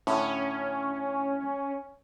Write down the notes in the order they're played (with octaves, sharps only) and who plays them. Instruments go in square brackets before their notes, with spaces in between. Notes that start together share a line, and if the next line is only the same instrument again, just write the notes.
[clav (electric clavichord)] A2 D3 [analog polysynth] C#4